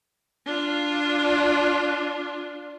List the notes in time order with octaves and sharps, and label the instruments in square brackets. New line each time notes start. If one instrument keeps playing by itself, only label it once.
[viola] D4 F4